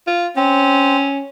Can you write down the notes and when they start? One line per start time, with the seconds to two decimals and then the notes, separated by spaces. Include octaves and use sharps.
0.07 F4
0.36 C4 C#4